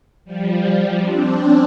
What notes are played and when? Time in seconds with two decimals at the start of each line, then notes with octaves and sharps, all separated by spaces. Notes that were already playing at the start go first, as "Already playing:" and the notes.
0.25 F3 G3
0.99 C4 D4
1.36 C#4